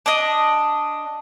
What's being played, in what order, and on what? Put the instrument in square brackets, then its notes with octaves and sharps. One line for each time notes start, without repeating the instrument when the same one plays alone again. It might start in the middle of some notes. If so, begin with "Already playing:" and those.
[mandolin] D4 D#5